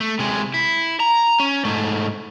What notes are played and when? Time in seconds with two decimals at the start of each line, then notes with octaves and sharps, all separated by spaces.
0.01 A3
0.19 C3 G#3
0.54 E4
1.00 A#5
1.40 C#4
1.65 G#2 A3